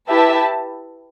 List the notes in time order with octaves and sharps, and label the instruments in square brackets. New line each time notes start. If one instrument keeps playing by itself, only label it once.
[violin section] E4 G4 B4 E5 A5